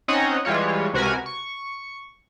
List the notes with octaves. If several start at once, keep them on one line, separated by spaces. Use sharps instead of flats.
C4 C#4 D#4 C#5 D#5 F#5
E3 G3 G#3 F4 C#5
C#2 C3 F#4 A#4 B4 G#5
C#6